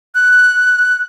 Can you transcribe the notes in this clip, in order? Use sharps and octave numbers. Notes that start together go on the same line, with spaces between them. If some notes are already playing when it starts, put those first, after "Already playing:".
F#6